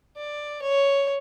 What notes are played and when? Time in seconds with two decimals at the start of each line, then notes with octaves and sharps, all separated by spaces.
0.16 D5
0.62 C#5